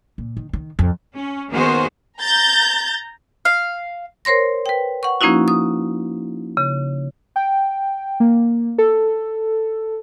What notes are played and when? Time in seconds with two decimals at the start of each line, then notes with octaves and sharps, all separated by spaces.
0.18 A#2
0.37 D#3
0.53 D#3
0.79 F2
1.16 C#4
1.50 D#3 A#3 B3 F#4 G#4 C5
2.20 A#5 G6 A6
3.45 F5
4.25 A#4 C5 C#5 C6 A#6
4.66 B4 G5
5.03 F#5 C#6
5.21 F3 A#3 C#4 D#4 E4 F#4
5.48 D#6
6.57 C#3
7.36 G5
8.20 A#3
8.78 A4